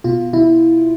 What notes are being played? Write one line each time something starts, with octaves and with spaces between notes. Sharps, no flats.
B2 F4
B2 E4